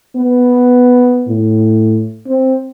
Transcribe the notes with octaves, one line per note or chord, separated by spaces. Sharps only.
B3
A2
C4